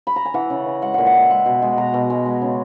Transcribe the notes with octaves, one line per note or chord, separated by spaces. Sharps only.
B5
A#5
G#5
E3 F#5
C#3
E3
G#3 F#5
A#2 F#5
F#5
G#3 E5
G#3 F#5
B2
G#3
B2 A#5
B2
G#3
G#3
C#3